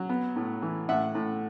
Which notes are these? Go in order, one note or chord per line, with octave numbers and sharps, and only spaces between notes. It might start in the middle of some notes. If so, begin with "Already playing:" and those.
Already playing: F#3
B3
A2
E3
A2 E5 F#5
A2